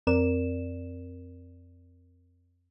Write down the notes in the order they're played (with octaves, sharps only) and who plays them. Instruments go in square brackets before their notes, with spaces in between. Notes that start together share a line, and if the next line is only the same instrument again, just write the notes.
[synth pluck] F2 C4 A#4 D5 E7